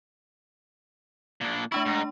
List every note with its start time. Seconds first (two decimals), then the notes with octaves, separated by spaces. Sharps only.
1.41 A#2 D4
1.72 A3 D4 E4 C#6
1.86 G#2 D#4